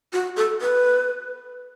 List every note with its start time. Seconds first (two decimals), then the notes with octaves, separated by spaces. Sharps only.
0.13 F#4
0.37 A4
0.61 B4